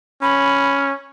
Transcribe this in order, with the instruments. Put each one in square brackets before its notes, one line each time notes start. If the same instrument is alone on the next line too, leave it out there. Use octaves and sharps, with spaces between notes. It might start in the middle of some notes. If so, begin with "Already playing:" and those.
[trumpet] C#4 [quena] B5